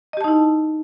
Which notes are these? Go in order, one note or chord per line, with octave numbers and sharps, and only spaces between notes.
D#4 E4 G4 D#5 A5